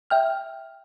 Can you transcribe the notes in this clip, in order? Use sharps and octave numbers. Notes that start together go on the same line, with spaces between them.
E5 G5 F6